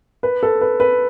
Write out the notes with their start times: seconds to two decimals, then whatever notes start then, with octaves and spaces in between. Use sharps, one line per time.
0.23 B4
0.43 A4
0.61 B4
0.80 B4